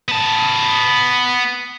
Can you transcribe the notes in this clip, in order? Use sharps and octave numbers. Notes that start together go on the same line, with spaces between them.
B3 A5